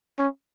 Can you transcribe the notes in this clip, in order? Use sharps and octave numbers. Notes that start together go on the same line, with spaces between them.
C#4